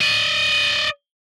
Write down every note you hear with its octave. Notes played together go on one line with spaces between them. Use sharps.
D5 D#5